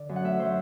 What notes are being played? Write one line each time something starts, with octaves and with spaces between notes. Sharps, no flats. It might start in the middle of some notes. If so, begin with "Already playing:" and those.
Already playing: D3 D5
F#2
F#5
A3 E5
F#3 C5